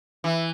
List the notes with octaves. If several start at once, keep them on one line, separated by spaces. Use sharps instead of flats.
E3